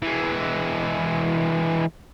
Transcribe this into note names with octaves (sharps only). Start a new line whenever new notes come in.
E3 G#3